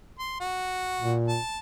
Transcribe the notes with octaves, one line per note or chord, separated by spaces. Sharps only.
C6
F#4
A#2
A5